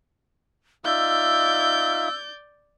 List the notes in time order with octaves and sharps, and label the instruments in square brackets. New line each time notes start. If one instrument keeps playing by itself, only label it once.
[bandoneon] D#4 F4 E5 [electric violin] D5 G6 [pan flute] E6